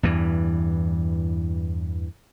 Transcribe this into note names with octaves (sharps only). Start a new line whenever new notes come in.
E2 G2 E3